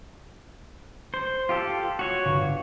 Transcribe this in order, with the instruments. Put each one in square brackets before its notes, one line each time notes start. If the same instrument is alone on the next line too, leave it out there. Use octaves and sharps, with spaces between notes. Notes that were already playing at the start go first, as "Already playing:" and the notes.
[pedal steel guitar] C5
F4 G4 A4
F#4 C#5
[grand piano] G1